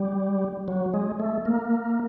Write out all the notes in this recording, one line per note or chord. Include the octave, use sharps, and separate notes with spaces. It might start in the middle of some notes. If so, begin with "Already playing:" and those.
Already playing: G3
F#3
G#3
A3
A#3